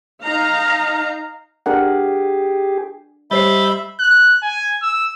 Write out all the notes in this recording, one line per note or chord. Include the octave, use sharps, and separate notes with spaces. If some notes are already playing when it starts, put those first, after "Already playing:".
D#4 F5 A#5
D4 G4 G#4 A#4 F#5
G3 C5 D#5 E5 B5 G6 A6 C7
F#6
G#5
E6